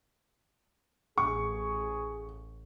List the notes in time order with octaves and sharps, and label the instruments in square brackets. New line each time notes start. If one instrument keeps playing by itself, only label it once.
[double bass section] A1 [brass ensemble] G#4 [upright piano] C#6